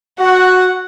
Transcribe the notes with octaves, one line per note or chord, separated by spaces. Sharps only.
F#4 F#5